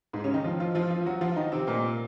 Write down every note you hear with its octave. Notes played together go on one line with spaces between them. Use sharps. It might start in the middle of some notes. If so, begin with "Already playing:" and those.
G#2 G#3
C#3 C#4
D#3 D#4
F3 F4
F3 F4
F3 F4
F3 F4
F#3 F#4
F3 F4
D#3 D#4
C3 C4
A#2 A#3